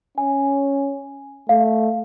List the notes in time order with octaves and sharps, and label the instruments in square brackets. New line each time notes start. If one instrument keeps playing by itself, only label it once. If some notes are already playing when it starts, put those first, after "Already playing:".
[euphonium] C#4 [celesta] G#5
[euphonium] A3 [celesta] F5